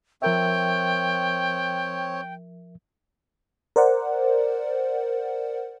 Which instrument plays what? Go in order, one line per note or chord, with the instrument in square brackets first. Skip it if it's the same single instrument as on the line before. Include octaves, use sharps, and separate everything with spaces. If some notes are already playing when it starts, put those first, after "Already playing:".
[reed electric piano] F3 A#4 E5 [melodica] C4 C#5 [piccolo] G5
[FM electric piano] A#4 C5 D5 F#5